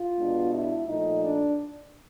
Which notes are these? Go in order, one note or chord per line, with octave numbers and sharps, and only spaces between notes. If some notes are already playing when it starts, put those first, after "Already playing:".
Already playing: F4
B2 G#3 B3 D4
E4
A#2 F3 A3 D#4
D4